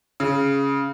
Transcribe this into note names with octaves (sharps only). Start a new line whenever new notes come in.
C#3